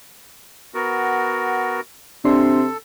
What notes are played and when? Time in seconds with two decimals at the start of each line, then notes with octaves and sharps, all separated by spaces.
0.75 B3 F#4 A#4
2.25 C3 D4 A4 C6